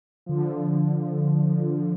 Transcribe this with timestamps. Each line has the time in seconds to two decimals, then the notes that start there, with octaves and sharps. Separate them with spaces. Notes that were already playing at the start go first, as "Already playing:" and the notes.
0.26 D3 F3